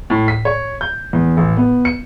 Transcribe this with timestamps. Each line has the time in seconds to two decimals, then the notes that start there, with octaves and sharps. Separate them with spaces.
0.10 A2
0.28 B6
0.45 C#5
0.81 G6
1.13 E2
1.37 A1
1.57 B3
1.85 C#7